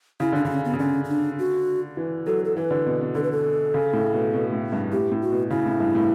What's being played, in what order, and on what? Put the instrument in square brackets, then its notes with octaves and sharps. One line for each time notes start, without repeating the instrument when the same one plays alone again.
[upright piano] C#3 [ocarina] E4
[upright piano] D3 [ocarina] D4
[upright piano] C#3 [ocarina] D4
[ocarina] C#4
B3
[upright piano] C#3
[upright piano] D3 [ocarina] C#4
[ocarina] C#4
D4
F#4
[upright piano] E3
[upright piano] F#3 [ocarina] A4
[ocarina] A4
[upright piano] E3 [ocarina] B4
[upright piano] D3
B2
B2
[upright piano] D3 [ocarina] A4
[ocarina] B4
A4
[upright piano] C#3
A2
B2
B2
A2
G2
[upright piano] A2 [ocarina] G4
[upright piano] A2
[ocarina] F#4
[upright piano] B2
[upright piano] C#3 [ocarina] E4
[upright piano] A2
G2
A2